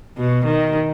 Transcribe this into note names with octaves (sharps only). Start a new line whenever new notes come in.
B2
D#3